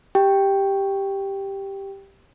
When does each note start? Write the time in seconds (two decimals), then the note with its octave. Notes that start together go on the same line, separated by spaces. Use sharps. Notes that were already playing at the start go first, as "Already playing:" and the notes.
0.15 G4 G5